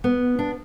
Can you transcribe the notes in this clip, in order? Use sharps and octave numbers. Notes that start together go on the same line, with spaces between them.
B3
D4